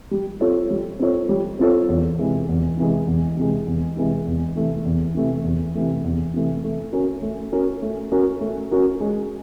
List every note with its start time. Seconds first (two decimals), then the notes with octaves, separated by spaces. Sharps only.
0.11 G3
0.40 C4 F4 A4 C#5
0.71 G3
0.99 C4 F4 A4 C#5
1.29 G3
1.59 C4 F4 A4 C#5
1.89 E2
2.18 C3 E3 G#3
2.49 E2
2.77 C3 E3 G#3
3.07 E2
3.37 C3 E3 G#3
3.67 E2
3.97 C3 E3 G#3
4.27 E2
4.55 C3 E3 A3
4.85 E2
5.15 C3 E3 A3
5.44 E2
5.75 C3 E3 A3
6.04 E2
6.34 C3 E3 A3
6.64 A3
6.93 C#4 F#4 A#4
7.22 A3
7.52 C#4 F#4 A#4
7.82 A3
8.12 C#4 F#4 A#4
8.41 A3
8.71 C#4 F#4 A#4
9.00 G#3